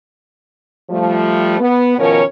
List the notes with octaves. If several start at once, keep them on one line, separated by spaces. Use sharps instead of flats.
F3 G3 A3
B3
B2 D#3 F3 C#4 A#4 C#5